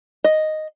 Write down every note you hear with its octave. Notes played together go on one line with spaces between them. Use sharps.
D#5